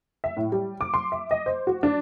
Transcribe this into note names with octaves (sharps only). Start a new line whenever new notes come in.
E5
A2
G3
D6
C6
E5
D#5
C5
F#4
D4